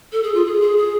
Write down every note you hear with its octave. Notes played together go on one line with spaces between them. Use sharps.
A4
G#4
F4
G#4
G#4
G#4